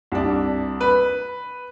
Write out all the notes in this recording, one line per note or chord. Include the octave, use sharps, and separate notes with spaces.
C2 D4
B4